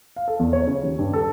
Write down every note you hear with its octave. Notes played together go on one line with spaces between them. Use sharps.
F5
A4
E2
C#5
C#3
D#2
G2
A4